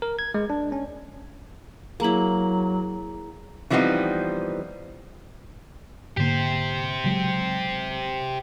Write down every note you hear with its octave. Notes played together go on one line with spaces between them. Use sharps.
A#4
G#6
G#3
D4
C#4
F#3 A#3 E4 G#4 A#5 F#7
E3 F3 G3 B3 C4 D#4
G#2 D3 A#3 G4 C5
C#3 F#3 G#3